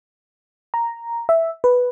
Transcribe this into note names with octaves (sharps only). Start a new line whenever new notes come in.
A#5
E5
B4